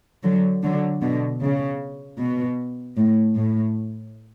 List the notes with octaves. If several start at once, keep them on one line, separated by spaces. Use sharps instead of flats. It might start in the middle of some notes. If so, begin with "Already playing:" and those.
D3 F#3
D3 F#3
B2 D3
C#3
B2
A2
A2